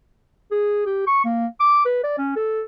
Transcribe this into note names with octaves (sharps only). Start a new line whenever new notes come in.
G#4
G4
C#6
A#3
D6
B4
D5
C#4
A4